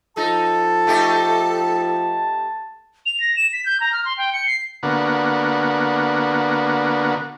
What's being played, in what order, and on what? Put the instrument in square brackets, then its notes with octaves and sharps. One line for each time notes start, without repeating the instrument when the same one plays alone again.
[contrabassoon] F3 [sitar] D#4 [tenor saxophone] A4 [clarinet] A5
[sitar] A3 D#4 G4
[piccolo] F7
A#6
E7
B6
G6
A#5
F6
C6
G5
C#7
C7
[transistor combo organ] D3 A#3 B3 F#4